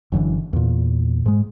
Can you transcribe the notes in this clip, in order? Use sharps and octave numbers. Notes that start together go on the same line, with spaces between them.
F#1 F#2 D3 E3
E2 A#2
G#2 G#3